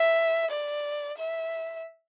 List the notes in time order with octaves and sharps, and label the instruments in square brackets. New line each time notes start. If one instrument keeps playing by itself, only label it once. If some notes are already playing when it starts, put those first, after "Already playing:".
Already playing: [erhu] E5
D5
E5